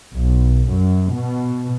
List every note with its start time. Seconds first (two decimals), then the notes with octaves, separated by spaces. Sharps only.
0.14 B1
0.71 F#2
1.15 B2